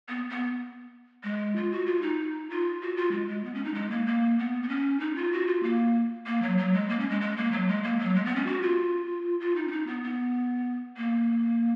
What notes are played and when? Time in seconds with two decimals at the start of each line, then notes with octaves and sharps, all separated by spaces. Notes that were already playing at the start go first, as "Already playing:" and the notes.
0.09 B3
0.30 B3
1.23 G#3
1.56 F4
1.71 F#4
1.86 F4
2.02 D#4
2.50 F4
2.81 F#4
2.97 F4
3.12 G#3
3.28 G#3
3.44 B3
3.55 C#4
3.64 D#4
3.74 G#3
3.90 A#3
4.06 A#3
4.38 B3
4.63 B3
4.69 C#4
5.00 D#4
5.16 F4
5.32 F#4
5.47 F4
5.63 A#3
6.26 A#3
6.42 F#3
6.58 F#3
6.73 G#3
6.89 A#3
6.99 C#4
7.10 G#3
7.21 G#3
7.37 A#3
7.52 F#3
7.68 G#3
7.83 A#3
7.99 F#3
8.15 G#3
8.25 B3
8.36 C#4
8.46 F#4
8.62 F4
9.40 F4
9.56 D#4
9.68 C#4
9.72 D#4
9.87 B3
10.03 B3
10.97 A#3